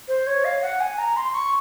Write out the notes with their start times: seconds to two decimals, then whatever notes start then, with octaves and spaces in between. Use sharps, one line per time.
0.08 C5
0.27 C#5
0.45 F5
0.62 F#5
0.80 G#5
0.99 A#5
1.17 C6
1.34 C#6